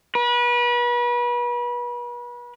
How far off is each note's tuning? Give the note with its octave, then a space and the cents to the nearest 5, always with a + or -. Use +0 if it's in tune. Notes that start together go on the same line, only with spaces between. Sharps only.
B4 -35